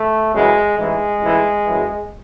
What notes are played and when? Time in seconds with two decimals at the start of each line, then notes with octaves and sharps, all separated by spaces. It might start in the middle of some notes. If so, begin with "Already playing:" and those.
Already playing: A3
0.33 F#2 C#3 E3 G#3
0.77 A1 G#2 E3 G#3
1.21 A1 G#2 E3
1.64 E3
1.69 F#2